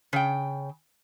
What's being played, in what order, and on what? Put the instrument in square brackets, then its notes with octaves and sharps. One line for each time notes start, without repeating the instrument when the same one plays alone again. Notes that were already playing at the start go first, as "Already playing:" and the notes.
[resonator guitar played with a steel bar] C#3 G5